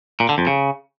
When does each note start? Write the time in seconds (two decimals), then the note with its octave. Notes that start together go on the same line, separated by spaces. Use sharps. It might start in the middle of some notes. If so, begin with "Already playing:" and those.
0.20 A#2
0.29 D3
0.38 F2
0.47 C#3